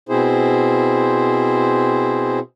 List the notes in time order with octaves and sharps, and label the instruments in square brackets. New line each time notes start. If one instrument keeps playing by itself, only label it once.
[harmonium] B2 C4 E4 G#4 C5